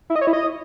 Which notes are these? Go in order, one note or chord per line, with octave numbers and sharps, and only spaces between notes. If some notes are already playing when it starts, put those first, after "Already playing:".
E4
D#5
C#5
E4
D#5